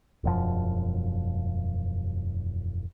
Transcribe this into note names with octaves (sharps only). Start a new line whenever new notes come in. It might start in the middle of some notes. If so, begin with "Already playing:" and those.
E1 F#2 F3